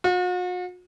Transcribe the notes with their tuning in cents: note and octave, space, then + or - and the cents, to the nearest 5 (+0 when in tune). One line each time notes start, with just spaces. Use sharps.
F#4 -45